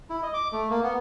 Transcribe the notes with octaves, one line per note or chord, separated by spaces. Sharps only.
E4
D#5
D6
A3
A#3
B3